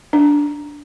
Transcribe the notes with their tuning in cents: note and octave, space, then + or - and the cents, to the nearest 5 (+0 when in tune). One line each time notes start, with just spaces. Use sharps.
D4 -10